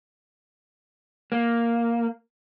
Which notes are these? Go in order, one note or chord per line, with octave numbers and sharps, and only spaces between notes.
A#3